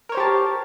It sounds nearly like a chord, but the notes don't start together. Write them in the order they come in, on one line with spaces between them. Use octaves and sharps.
A#4 C#5 C5 G4 A5